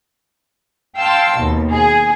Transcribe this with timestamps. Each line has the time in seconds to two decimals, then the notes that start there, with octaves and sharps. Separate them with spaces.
0.97 F5 G5 A5 C6 E6
1.39 D#2 B2
1.73 G#4